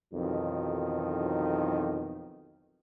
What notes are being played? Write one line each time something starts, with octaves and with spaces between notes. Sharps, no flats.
B1 F2 D#3 E3 F#3